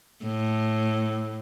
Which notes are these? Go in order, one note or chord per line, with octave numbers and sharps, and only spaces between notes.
A2